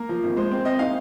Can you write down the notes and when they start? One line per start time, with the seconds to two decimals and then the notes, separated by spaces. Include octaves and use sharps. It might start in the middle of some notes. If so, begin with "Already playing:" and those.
Already playing: A#3 A#4
0.09 F3
0.23 G#1
0.36 G#3 C5
0.51 C4
0.65 C4 D#5
0.79 D#4 F5